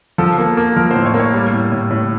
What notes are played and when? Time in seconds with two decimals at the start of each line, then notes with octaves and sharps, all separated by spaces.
0.18 F3 A4
0.38 A#3
0.57 A#3
0.76 F3 A#4
0.91 A2 C5
1.05 C#5
1.14 A#3
1.20 C#5
1.34 G3
1.53 A2
1.72 A2
1.90 A2